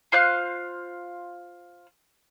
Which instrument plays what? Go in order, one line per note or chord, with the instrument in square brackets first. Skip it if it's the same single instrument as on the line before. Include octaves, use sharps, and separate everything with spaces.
[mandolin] F4 C5 F5 F#6